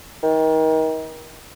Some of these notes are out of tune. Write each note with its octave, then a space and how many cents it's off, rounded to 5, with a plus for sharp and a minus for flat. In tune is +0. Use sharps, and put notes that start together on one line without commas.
D#3 +30